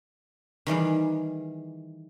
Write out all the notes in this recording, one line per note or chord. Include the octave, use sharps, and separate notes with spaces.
D#3 E3 G3 G#4